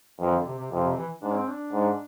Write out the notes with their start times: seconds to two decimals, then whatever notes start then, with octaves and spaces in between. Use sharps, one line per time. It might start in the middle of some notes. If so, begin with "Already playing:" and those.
0.20 F2 E3
0.32 D3
0.46 C3
0.59 C3
0.72 F2 C3
0.83 C3
0.97 E3
1.22 G#2 D4
1.35 C4
1.49 D4
1.73 G#2